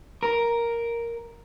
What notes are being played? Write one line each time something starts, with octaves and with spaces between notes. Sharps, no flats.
A#4